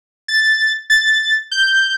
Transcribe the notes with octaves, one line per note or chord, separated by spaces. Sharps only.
A6
A6
G6